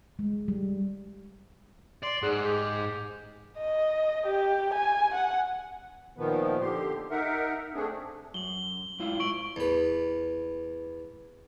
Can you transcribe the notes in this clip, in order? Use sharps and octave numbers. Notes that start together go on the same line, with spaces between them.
G#3
G3
D5 C6
G#2 G#4 F#5
G4 G#4
D#5
G4
G#5
F#5
A#2 D#3 F3 B3
D3 G4 C6
D#4 A#4 E5 F#5
A3 C4 D4 G#4
F#2 F#7 G7
G#2 E4 F4
G#2 C#6 D7 F#7
E2 B4